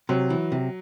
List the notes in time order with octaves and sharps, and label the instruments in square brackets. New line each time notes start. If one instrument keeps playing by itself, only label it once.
[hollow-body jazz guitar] C3 [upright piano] F#3
[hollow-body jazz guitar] E3
C3